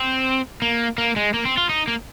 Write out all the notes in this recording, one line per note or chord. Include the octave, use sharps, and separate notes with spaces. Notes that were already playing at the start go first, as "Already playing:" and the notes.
Already playing: C4
A#3
A#3
G#3
A#3
C4
F4
D#4
A#3